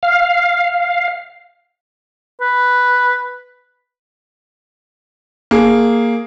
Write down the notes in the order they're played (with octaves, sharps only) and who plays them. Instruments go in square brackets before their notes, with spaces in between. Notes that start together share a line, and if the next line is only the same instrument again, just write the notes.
[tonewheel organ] F5
[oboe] B4
[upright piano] A#3 G#4